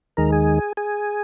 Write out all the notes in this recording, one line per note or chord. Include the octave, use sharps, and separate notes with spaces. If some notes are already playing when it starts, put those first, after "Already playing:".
D#2 D#3 G#3 A#4
G#4
G#4